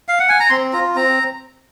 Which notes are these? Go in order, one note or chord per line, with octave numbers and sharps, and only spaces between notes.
F5
F#5
G#5
A#5
C4 C6
F4 A#5
C4 A#5